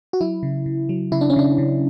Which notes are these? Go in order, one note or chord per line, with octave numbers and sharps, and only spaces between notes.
F#4
F#3 E4
C#3
C#3
F#3
C#3 E4
D4
C#4
C#3 D4
C#3